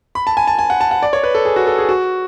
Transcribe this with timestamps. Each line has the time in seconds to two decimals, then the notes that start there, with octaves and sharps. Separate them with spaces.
0.15 B5
0.27 A5
0.37 G#5
0.47 A5
0.59 G#5
0.70 F#5
0.81 A5
0.91 F#5
1.03 D5
1.13 C#5
1.23 B4
1.35 A4
1.45 G#4
1.56 F#4
1.67 A4
1.78 G#4
1.89 F#4